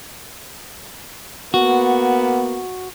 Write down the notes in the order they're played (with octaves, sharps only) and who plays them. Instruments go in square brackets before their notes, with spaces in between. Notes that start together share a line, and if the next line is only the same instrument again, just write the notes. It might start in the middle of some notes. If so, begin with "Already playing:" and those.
[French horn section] A#3 B3 [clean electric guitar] F#4